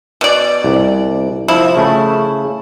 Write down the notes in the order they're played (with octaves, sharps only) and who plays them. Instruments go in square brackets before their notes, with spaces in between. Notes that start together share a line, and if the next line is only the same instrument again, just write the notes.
[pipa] B2 D5
[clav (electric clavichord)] C2
[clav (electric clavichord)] F3 [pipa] E4
[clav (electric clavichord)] C#3 A3